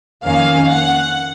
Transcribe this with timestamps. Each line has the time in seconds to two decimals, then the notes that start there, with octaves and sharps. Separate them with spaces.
0.25 F2 D#3 A#3 C#4 F5
0.71 F#5